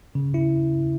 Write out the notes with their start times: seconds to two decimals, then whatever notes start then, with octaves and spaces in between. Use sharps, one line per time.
0.15 C#3
0.34 E4